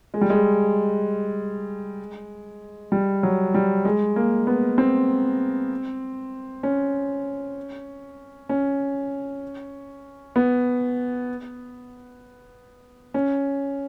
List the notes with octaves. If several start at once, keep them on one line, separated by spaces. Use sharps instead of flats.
G#3
G3
G#3
G3
F#3
G3
G#3
A#3
B3
C4
C#4
C#4
B3
C#4